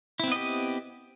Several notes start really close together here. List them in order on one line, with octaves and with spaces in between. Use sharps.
E4 C4 B3 D#5 G4